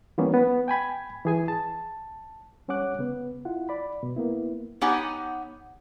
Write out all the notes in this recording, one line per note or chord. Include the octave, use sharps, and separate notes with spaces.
E3 G3 A#3 B3 C#4
B3
G5 G#5 B5 G#6
E3 G#4 G#5
A5
G3 C#4 C#5 F#5 D6 F#6
C#3 B3
E4 F4 F#5
D5 B5
B2
A#3 B3 E4
B3 D#4 G4 C#5 F#5 G#5